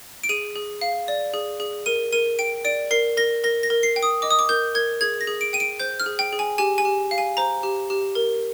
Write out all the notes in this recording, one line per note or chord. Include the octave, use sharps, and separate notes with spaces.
D7
G#4 D#7
G#4
F5
D5
G#4
G#4
A#4 D#7
A#4 D#7
G5 D7
D5 D7
A#4 C7
A#4 A#6
A#4 A#6
A#6
A#4
C7
G5
D#6
D#5 D6
D#6
D6
A#4 G6
A#4 G#6
G#4 G#6
A#6
G#4
D7
G5 D#7
D7
C5 G6
F6
G#4
G5
G#4
G#5
G4 G#5
G#5
G4
F5
G#5
C5 A#5
G4
G4
A#4